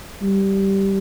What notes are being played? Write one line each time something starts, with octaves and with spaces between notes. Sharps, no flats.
G3